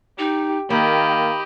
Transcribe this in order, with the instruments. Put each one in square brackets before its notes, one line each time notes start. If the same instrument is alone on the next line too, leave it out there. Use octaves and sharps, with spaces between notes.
[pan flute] D#4 [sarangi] G4
[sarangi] D#3 [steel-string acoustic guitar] A#3 [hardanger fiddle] G4 D#5 [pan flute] B5